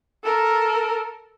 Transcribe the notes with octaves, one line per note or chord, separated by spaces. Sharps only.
A4 A#4